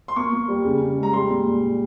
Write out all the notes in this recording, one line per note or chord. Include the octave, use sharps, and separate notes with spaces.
C6
A#3 C#6
A#3
G3
C#3
C#3
G#3
A#5
G3 C6
A#2